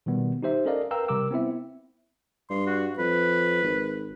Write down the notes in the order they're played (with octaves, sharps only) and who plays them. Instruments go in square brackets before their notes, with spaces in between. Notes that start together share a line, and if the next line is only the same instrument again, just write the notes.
[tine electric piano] B2 D#3 G3 B3
D#4 G4 C5 E5
C#4 A4 A#4 D5 D#5 F5
A#4 B4 F5 G5 A#5 E6
C3 G3 A#4 D6 E6
B3 C4 E4 E5
[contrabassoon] G2 [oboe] C6
[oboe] F#4
[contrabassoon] F2 [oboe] B4
[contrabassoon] G#1